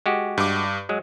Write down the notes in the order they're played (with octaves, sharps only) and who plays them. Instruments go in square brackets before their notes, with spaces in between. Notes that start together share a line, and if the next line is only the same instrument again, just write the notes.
[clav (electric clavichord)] G#3 F#4 G4
[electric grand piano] G2 D6
[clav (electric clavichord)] F#3 G#3